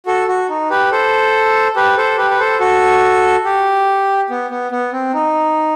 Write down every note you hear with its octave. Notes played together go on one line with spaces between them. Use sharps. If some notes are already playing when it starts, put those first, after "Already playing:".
F#4 A4
F#4
D#4
G4 B4
A4 C5
G4 B4
A4 C5
G4 B4
B4
A4 C5
F#4 A4
G4
B3
B3
B3
C4
D#4